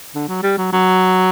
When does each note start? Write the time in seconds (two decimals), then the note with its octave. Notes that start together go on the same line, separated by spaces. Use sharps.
0.15 D3
0.28 F#3
0.43 G3
0.57 F#3
0.73 F#3